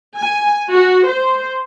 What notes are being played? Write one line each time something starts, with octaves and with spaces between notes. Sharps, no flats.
G#5
F#4
C5